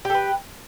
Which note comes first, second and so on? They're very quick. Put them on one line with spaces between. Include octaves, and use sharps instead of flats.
G4 A4 B4